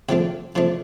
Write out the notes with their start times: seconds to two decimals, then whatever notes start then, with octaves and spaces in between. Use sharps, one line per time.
0.09 C3 F3 A3 D4 G5
0.55 C3 F3 A3 D4